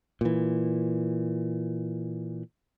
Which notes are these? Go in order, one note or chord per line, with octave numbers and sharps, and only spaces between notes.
A#2 E3